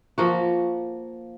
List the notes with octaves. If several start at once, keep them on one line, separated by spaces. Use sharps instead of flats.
F3 A#3 F#4